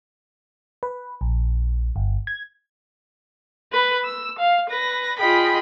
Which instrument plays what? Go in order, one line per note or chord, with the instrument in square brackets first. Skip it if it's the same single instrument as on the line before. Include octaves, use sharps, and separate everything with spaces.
[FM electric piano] B4
A#1
G1
G#6
[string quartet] B4
E6
F5
B4 A#6
F4 G#4 D#5 G5 B5